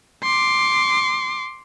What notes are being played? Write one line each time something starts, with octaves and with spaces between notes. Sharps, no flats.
C6 D6